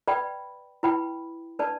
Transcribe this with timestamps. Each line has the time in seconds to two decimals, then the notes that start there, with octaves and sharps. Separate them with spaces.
0.08 B4 D5 G5 B5
0.83 E4 B4 G5 B5
1.59 D4 B4 D5 A5